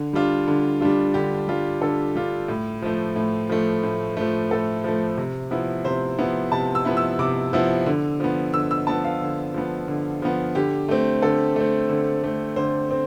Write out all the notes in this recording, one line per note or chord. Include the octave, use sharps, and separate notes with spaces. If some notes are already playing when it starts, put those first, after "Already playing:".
Already playing: D3
G3 D4 F4
D3
G3 D4 F4
D3 G4
G3 D4 F4
D3 A4
G3 D4 F4
A2
F3 A3
A2
F3 A3
A2
F3 A3
A2 A4
F3 A3
C3
F3 B3 E4
C3 C5
F3 B3 E4
C3 A5
E6
F3 B3 E4
E6
C3 D6
F3 B3 E4
D3
F3 B3
D3 E6
E6
F3 B3 A5
F5
D3
F3 B3
D3
F3 B3
D3 G4
A3 C4
D3 A4
A3 C4
D3
A3 C4
D3 C5
C4